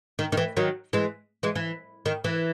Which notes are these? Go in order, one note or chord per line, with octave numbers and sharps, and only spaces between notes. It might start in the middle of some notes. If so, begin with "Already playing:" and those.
D#3
D#3
E3
D#3 F#3
E3 G#3
E3 G#3
E3
D#3
E3